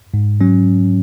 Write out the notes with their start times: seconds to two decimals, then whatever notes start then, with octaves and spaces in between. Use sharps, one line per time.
0.14 G#2
0.41 F#3 C#4